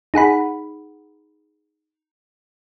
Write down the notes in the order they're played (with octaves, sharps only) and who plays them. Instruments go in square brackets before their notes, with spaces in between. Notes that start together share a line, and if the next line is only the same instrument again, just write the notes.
[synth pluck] D#4 G#4 F#5 B5